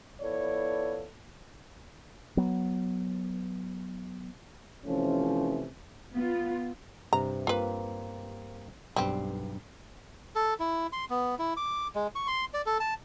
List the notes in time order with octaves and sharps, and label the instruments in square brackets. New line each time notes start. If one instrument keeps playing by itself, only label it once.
[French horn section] F3 B3 E4 A4 C#5 D5
[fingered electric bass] F#3 B3
[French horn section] C3 E3 F3 A3 C#4
[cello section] B3 F4
[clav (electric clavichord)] G2 C3 [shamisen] A#5
[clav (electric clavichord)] G2 A#3 C4 [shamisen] F4 B4
[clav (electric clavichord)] B1 G2 [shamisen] G3 C4
[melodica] A4
E4
C6
B3
E4
D6
G#3
C#6
C6
D5
A4
A5